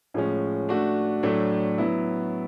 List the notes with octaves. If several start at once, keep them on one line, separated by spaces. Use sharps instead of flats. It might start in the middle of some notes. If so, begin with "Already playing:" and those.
A2 F3 G#3 C#4
A3 D4 F#4
A2 F#3 A3 D4
F#3 B3 E4